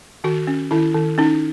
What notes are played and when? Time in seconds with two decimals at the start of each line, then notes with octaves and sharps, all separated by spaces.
0.24 D#3 F#4
0.47 C#4
0.71 D#3 E4
0.94 D#3
1.18 C#4 D#4